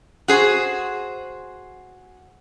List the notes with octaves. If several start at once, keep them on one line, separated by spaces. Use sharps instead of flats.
F#4 G#4 C5